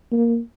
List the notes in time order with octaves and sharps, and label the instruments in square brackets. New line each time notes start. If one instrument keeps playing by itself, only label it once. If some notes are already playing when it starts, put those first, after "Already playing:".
[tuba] A#3